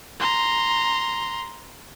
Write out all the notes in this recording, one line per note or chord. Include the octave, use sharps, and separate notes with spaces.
A#5 C6